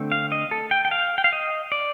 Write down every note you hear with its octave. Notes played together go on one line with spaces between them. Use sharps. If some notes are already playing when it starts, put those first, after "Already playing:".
Already playing: D3 A3 C4
F5
D#5
A4
G5
G5
F5
G5
F5
D#5
D5